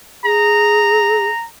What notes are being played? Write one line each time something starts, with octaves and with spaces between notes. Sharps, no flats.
G#4 A#5